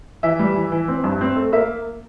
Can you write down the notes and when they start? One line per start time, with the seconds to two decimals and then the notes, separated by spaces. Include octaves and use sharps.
0.23 E3 E5
0.39 G3
0.56 E3
0.72 E3
0.88 C4
1.04 G2
1.21 C4
1.36 A3
1.52 A#3 E5